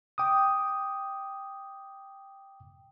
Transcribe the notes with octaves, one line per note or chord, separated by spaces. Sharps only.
G5 D6 D#6